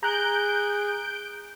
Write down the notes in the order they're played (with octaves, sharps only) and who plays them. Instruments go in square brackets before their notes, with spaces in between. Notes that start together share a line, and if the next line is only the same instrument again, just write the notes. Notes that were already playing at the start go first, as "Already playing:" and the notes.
[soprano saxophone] G#4 [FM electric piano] A#5 F#6 [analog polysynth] G6 D7